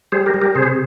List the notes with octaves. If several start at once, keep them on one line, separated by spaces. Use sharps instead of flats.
G3 G#4 C5
G4 A#4
G3
G4 A#4
C3 G#4 C5